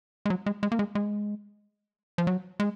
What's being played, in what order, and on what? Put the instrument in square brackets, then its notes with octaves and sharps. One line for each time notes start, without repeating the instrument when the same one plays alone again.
[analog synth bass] G#3
F#3
G#3
G#3
A#3
G#3
G#3
F3
F#3
G#3